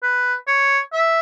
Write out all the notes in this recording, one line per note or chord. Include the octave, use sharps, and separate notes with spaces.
B4
C#5
E5